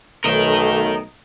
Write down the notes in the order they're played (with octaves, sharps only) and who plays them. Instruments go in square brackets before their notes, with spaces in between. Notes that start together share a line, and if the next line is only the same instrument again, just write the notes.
[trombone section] B1 A3 [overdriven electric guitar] A#4 D#5